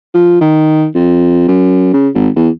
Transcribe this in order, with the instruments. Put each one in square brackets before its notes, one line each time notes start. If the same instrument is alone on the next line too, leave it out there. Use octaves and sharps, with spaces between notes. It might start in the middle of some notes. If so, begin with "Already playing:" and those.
[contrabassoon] F3
D#3
F2
F#2
C#3
G#1
E2